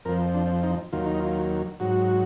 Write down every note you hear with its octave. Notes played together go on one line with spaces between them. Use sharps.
F2 F3 A#4
D4
D#4
D#2 D#3 F#3 F4
D#4
F4
G#2 F#3 F#4